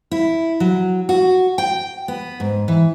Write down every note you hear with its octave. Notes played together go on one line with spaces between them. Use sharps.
E4
F#3
F#4
G5
B3
G#2
E3